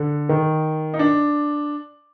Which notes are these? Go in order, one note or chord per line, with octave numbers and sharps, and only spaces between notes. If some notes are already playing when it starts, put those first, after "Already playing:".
Already playing: D3
D#3
D#4
D4